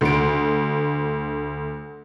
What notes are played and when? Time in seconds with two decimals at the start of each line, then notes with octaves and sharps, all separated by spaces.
0.01 D2 D7